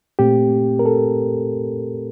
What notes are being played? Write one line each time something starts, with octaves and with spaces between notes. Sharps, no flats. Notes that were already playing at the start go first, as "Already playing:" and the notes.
A#2 A3 C4 G4
A#4
A4